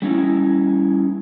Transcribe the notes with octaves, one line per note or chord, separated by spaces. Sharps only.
G3 C#4 D#4 E4